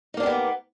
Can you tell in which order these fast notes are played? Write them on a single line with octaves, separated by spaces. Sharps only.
D#4 A#3 D4 G4 B3